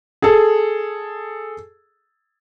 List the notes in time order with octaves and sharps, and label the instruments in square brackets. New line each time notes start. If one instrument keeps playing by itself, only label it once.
[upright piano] G#4 A4